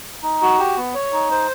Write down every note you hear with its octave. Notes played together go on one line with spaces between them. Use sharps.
D#4
F#4
G4
B3
C#5
D#4
C5